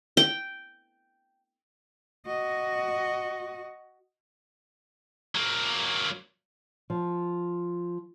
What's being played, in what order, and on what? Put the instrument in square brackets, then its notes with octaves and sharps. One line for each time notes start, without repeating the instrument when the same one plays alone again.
[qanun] G5
[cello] F#4 D#5
[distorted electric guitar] F#3 A#3
[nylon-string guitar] F3